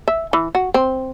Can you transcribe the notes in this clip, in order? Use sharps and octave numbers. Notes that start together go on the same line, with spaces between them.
E5
E3
F#4
C4